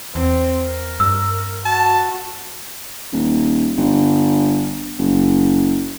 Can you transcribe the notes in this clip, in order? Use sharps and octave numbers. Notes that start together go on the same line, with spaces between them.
E2 C4
A#4
G2 E6
F#4 A5
D#1
G1
F#1